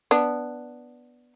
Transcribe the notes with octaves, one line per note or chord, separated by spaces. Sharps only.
B3 D4